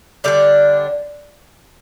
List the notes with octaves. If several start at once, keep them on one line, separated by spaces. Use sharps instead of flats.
D3 G3 D4 D5